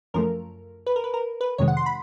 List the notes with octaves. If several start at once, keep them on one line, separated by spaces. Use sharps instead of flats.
F#2 C#3 F3 A3 A#4
B4
A#4
B4
A#4
B4
F2 C3 D#3 G#3 C#5
F#5
C6
B5